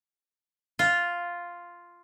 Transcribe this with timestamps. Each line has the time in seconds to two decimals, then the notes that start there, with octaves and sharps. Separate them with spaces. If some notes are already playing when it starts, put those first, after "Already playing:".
0.79 F4